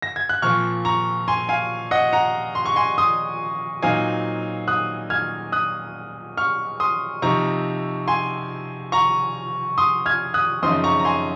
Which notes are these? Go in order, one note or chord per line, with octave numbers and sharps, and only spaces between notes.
A#6
G#6
F#6
A#2 F3 C4 C#6 F6
A#5 C#6
G#5 C6
F5 G#5
D#5 F#5
F#5 A#5
C6
C#6
G#5 C6
C6 D#6
A#2 F#3 C4 D#4 F5 G#5
D#6 F#6
F6 G#6
D#6 F#6
C#6 F6
C6 D#6
C3 F3 C4 D#4 A#5 C#6
G#5 C6
A#5 C#6
C6 D#6
F6 G#6
D#6 F#6
F#2 C#3 F3 C4 D#4 C6 D#6
A#5 C#6
A#5
G#5 C6